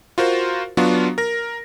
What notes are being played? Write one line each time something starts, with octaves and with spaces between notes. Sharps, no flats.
F4 F#4 A#4 C5
F#3 B3 D4 F4 F#4
A#4 A#6